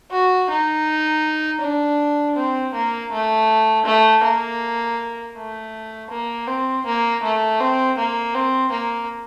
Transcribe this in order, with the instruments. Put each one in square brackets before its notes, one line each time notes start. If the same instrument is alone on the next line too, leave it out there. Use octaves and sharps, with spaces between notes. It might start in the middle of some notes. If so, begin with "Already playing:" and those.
[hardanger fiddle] F#4
D#4
D4
C4
A#3
A3
A3
A#3
A3
A#3
C4
A#3
A3
C4
A#3
C4
A#3